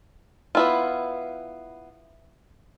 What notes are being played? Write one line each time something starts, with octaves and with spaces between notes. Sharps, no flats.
B3 E4 F4